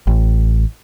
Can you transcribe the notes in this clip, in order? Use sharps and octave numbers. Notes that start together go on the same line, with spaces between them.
A1